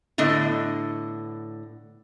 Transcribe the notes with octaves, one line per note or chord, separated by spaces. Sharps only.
A2 D3 B3 D#5